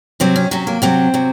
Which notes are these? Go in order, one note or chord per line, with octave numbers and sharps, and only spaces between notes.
C3 F#3 C4
C#4
C3 F#3 C#4
A#3
C3 F#3 C4
C3 F#3